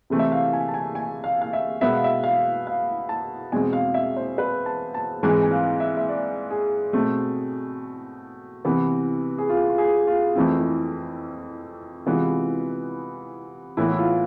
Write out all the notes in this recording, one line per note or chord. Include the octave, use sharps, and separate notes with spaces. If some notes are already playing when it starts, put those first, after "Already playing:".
C3 E3 A3 C4
E5
F5
G#5
A5
G#5
G#5
F5
F5
E5
B2 G#3 B3 E5
F5
E5
F5
F5
A5
E2 B2 G#3 C4 G#5
F5
E5
C5
B4
A5
A5
G#2 E3 G#3 C4 G#5
G#5
F5
E5
E5
D5
G#4
B2 A3 C4
C3 E3 B3
G#4
F4
F4
G#4
F4
F2 E3 A3 C4 E4
E4
C3 E3 G#3 B3 F4
A2 E3 B3 E4
E4
F4